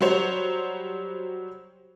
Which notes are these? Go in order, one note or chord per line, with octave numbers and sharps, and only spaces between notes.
F#3 G3 C5 C#5